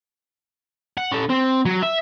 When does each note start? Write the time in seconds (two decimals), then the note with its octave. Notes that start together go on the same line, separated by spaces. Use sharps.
0.98 F#5
1.12 C#4 A4
1.29 C4
1.65 F#3
1.82 E5